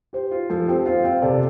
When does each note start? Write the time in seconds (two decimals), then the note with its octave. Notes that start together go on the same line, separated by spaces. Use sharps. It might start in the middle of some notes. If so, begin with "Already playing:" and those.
0.13 G4 C5
0.31 F4
0.50 F3 A4
0.67 C4 G4 C5
0.85 F4 C5 F5
1.04 C4 C5 F5
1.22 C3 A4 D5